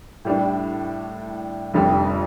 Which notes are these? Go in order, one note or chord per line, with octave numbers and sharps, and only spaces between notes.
A2 G3 D4
F1 F2 D3 G3